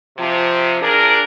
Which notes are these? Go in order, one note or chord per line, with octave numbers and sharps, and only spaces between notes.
C3 F3
D4 G#4 A#4